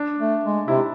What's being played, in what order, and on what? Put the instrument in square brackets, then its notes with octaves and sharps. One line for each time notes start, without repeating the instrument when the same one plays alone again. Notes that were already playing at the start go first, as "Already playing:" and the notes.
Already playing: [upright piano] D4
[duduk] A3
G#3
[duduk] C3 [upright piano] E4